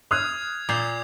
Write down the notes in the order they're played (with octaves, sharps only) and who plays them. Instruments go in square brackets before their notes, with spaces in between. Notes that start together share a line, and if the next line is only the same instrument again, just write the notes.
[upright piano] D#6 F6 F#6 [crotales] G#6 C7 F7
[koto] A#2 [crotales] D6 G6 C7